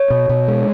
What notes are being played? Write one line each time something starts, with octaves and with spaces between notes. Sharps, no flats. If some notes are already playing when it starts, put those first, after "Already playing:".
Already playing: C#5
B2
B2
G#3